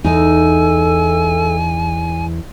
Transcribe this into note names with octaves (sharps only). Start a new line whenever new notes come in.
E2 D#4 A4 G#5